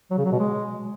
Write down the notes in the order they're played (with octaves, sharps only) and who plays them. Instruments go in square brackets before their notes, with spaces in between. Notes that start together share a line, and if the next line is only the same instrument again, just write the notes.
[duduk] F#3
C#3
F#3
B2
G#3